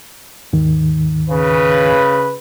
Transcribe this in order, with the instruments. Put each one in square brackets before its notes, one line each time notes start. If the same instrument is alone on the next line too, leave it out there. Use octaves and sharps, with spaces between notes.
[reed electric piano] D#2 G#2 D#3
[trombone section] C#3 B4